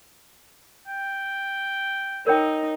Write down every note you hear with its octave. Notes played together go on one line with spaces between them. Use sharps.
G5
D#4 A#4 C#5 G5